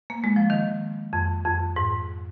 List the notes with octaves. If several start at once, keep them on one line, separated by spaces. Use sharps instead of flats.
A#3
G#3
F3
D#3
F2
F2
G#2